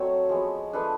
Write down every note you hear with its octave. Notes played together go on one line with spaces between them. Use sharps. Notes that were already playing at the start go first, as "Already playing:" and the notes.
Already playing: F#3 A3 C4 C#5 D#5
F3 G#3 B3
F3 A3 D4 A4 B4